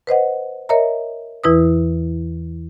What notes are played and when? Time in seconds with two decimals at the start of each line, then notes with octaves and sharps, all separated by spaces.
0.07 B4 C5 D#5 F#5
0.69 A#4 C#5 D#5 E5 A#5
1.44 E2 E3 E4 B4 D#6